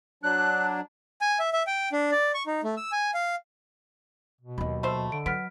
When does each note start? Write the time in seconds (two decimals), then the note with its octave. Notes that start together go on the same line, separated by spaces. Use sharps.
0.23 F#3 D4 F#6
1.21 G#5
1.39 E5
1.53 E5
1.67 G5
1.92 D4
2.12 D5
2.34 C#6
2.47 D#4
2.64 A3
2.77 E6
2.92 G#5
3.14 F5
4.41 B2
4.58 D#2 F#3 D#5 B5
4.83 A3 C5 B5 E6
5.12 D3 D7
5.26 F#3 B3 F6 B6 D7